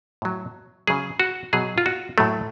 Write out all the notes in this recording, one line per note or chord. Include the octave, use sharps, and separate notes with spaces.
A2 F#3
C#3 F#3 G#4
F#4
B2 F#3 G#4
F4
F#4
A2 F#3 A3